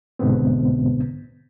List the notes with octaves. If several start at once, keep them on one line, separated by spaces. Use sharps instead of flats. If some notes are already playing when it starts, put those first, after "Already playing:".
C2 G#2 B2 D3 B3 C4